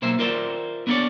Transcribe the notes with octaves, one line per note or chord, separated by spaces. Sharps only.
B1 A#3 C5 E5
F4 A#4 C5 D5 E5
B3 D4 E4 A4 C#5 D5